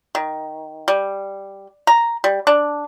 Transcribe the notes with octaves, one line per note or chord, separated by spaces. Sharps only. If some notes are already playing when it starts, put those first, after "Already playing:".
D#3
G3
A#5
G3
D4